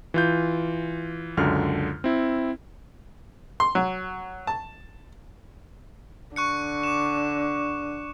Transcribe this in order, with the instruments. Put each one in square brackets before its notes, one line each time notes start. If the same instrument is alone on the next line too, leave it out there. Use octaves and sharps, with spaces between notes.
[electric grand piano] E3 F4 G6
C#2 F#2 D3 F6
C4 E4
[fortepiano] C6
F#3
A5
[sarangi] D3 [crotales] C#6 F#6 C#7
[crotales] D6 E7